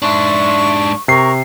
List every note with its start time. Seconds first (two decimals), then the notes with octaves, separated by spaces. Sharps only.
0.02 G#2 D4 E5 C6 C#6
1.08 C3 A#4 C#6 C7